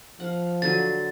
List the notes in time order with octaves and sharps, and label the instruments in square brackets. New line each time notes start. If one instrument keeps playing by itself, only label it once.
[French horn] F3 [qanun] F5 F#5
[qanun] D3 F#3 G#5 [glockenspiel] A6